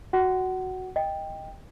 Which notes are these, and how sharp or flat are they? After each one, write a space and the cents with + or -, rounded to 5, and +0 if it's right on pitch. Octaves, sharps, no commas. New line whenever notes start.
F#4 +0 F#5 +20
D#5 +10 G5 +10